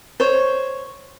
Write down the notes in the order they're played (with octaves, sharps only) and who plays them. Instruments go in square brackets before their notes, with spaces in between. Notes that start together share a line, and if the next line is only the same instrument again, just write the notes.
[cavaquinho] C5 C#5